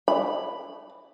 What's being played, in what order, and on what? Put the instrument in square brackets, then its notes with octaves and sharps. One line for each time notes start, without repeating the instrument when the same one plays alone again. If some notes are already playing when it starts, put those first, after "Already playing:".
[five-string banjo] B5